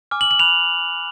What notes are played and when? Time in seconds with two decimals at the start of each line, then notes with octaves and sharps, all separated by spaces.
0.11 G#5 D6 F6
0.21 F#7
0.31 F#7
0.39 B5 F#6 F7